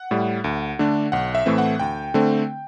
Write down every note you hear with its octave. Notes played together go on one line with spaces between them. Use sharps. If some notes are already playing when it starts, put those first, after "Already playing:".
Already playing: F#5
A2 G3
D2
D3 A3 D4
B1 F#5
E5
A2 E3 A3 C4
F#5
D2 G5
D3 A3 C4